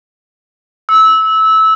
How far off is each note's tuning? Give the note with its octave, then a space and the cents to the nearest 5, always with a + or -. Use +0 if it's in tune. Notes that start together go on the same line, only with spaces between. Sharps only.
E6 -20